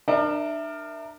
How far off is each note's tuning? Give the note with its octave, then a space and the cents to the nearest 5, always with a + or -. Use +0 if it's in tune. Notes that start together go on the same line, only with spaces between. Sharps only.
D4 +35 A#4 +0 E5 +0